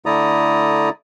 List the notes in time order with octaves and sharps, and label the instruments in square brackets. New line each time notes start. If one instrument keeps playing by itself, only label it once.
[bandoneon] D3 A3 E4 D5 A#5 D#6